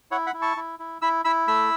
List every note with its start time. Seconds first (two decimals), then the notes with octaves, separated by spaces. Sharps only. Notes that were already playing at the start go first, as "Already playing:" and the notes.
0.11 E4 C#5 F#5
0.27 F#5 B5
0.34 E4
0.42 A5 C#6
0.57 E4
0.79 E4
1.02 E4 B5 E6
1.25 E4 B5 E6
1.48 A3 B5 E6